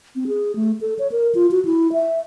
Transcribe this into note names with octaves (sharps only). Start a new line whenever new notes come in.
C4
G#4
A3
A4
C#5
A#4
F4
F#4
E4
E5